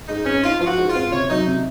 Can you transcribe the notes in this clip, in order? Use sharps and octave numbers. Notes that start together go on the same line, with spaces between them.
G#2 D#4
C4 C#4
D#4 F4
F3 F4
F#4
G#2
F4
C4
C3 C#5
F#3 D#4
C3